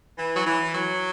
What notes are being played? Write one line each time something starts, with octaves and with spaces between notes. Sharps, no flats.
E3
F#3
E3
F#3